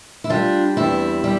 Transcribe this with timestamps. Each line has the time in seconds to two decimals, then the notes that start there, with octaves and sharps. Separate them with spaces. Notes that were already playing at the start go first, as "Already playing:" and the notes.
0.24 E4
0.30 G3 D4 F4
0.77 E2 C4 E4
1.24 G3